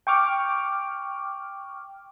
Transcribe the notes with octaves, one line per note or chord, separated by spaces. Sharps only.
G5 C#6 D6 F6